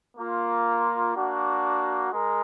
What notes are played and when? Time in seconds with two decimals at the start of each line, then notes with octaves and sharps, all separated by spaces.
0.17 A#3 F4
1.15 A#3 D4 F#4
2.13 G#3 A#4